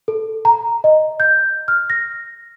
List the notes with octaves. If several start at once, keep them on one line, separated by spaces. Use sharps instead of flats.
A4
A#5
D#5
G6
F6
A#6